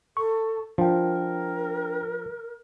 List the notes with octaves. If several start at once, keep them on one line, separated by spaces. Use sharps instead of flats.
A4 C#6
F3 D4 A#4 G5